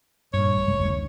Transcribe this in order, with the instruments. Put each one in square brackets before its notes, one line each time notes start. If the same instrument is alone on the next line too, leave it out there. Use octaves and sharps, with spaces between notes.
[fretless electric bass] G2 A#2 [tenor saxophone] C#5
[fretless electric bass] A1
F#1 C3 G#3
F#1 D2